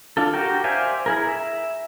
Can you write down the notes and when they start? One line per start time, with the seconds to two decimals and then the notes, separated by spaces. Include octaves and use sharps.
0.17 D4 F4 A4
0.34 F#4 G4 A#4 G5
0.64 C5 D5 E5 F5 G#5
1.06 E4 G#4 A#4
1.29 E5